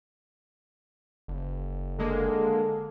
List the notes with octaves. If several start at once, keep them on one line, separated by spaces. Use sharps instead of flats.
F#1
D3 G#3 A#3 A4